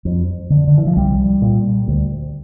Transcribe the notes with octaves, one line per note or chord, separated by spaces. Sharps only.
F2
D3
D3
E3
F3
C2 G3
A#2
D2